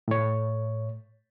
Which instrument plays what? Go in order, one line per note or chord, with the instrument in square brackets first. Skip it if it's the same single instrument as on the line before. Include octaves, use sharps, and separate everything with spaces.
[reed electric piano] A2 C#5